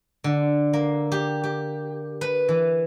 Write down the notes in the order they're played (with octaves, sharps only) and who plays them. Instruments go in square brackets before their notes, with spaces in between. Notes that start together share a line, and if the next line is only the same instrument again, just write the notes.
[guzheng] D3
A#3
G4
G4
B4
E3